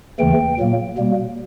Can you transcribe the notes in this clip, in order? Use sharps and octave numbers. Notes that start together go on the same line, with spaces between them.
D#2 C#3 E3 A3 G5
A#2 F#3 A#3
B2 G3 A#3